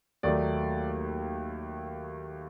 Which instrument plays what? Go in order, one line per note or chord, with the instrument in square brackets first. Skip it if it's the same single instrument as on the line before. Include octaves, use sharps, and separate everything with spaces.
[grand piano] D#2 D#3 F#3 A3 D5